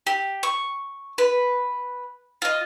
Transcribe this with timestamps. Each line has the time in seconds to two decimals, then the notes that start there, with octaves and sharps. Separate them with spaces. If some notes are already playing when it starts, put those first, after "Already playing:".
0.07 G4
0.43 C#6
1.18 B4
2.42 F4 D#5